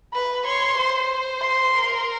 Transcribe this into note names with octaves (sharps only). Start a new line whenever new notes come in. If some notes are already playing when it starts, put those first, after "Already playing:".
B4 B5
C#5 C6
C5
C6
A#4